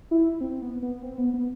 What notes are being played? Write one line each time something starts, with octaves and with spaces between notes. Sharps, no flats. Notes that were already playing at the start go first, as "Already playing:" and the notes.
E4
C4
B3
B3
C4
B3
B3